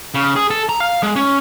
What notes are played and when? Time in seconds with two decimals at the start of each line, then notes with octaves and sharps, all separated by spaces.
0.14 C#3
0.36 G#4
0.50 A4
0.69 A#5
0.80 F5
1.03 G#3
1.16 C#4